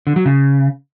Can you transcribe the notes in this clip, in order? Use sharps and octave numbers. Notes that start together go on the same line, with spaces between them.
D3
F#3
C#3